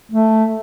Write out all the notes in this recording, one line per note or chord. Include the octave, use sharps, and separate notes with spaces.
A3